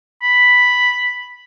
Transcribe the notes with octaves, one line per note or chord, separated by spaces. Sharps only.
B5